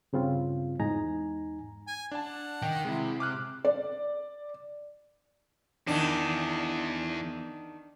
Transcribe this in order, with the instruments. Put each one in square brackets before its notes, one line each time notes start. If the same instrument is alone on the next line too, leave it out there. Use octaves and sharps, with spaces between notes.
[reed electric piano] G2 C#3 C4 F4
E2 G#2 D#4 G#5 A#5
[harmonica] G#5
[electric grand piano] D4 A5 [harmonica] F#5
[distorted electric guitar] D#3 [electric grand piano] G5
[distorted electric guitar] C3 [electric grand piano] G#3 E4
[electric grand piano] D6 F6 F#6
[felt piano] D5
[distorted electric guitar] E2 [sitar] D#3 D4